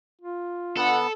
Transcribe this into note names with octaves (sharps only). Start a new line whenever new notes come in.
F4
D3 B3 A4 F#5